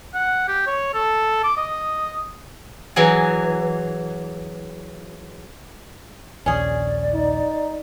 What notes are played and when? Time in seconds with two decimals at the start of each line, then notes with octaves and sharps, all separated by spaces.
0.14 F#5
0.48 G4
0.67 C#5
0.94 A4
1.44 D6
1.57 D#5
2.96 E3 F#3 G#4
6.46 A#1 D#2 C#4 G#4 D5
7.14 D#4